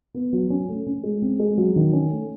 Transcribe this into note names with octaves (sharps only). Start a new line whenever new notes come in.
B3
F#3
C#4
A3
C#4
G#3
C4
G#3
F#3
D#3
C#4
A3